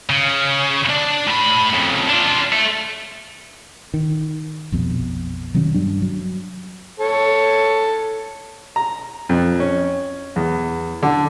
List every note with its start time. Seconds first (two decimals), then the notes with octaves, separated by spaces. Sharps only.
0.10 C#3
0.90 D4
1.28 A2 B5
1.74 F2 C#3
2.09 D4 F4
2.52 A3
3.94 D#3
4.72 A#1 F2 B2
5.54 C3 D#3 F#3 C#4
5.74 G2 F#3 G3 D4
6.02 F#3
7.00 A4 C#5
8.76 A#5
9.29 F2
9.60 C#4
10.36 E2
11.03 D3